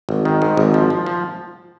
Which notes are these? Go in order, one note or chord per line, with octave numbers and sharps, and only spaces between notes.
G#1
D#3
G#2
G#1
F3
F3
F3